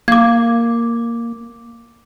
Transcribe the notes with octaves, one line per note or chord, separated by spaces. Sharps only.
A#3 D6 G#6